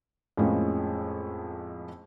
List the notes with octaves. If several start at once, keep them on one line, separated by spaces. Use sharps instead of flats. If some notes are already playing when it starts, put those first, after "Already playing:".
F2 A2 F3 G#3 A#3 C#4